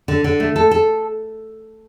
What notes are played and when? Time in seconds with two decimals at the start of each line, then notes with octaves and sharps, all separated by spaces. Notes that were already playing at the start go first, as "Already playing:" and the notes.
0.08 D3
0.24 D3
0.40 A3
0.56 A4
0.71 A4